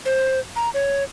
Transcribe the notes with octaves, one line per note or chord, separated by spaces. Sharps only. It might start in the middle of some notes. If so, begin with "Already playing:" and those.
C5
A#5
C#5